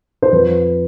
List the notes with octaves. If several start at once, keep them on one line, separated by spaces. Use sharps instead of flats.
C5
F2 B4